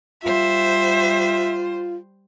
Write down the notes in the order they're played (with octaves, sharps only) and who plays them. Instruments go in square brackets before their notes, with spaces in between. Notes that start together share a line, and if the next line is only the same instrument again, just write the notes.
[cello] G3 C5 [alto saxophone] F4 [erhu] E5